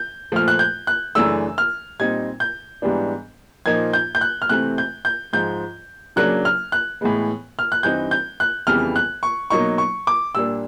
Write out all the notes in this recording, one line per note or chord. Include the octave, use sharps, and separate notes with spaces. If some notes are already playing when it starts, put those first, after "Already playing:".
Already playing: G6
A#2 F3 A3 F6
F#6
G6
F#6
F#2 C#3 E3 A3 D4 E6
F6
A#2 G3 C4 D#4 G#6
G6
G#2 E3 G3 B3 D4
A#2 F3 A#3 D#4 G#6
G6
G6
F#6
F6
C3 E3 A3 C4 F#6
G6
G6
G#2 F3 G#3 G6
C#3 F#3 A#3 D4 F#6
F6
F#6
A2 E3 G#3 B3
F6
F#6
G2 E3 G3 C4 D#4 G6
G6
F#6
F2 C#3 E3 G3 B3 F6
F#6
C#6
B2 F#3 A#3 D#4 C#6
C#6
D6
A#2 G3 A#3 D4 E6